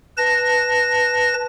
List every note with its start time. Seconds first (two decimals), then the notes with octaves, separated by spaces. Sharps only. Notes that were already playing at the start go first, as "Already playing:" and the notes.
0.18 B4 A5 A#6